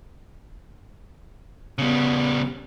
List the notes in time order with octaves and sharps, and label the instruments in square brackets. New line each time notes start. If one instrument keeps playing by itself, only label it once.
[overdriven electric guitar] C#3 G3 [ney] B3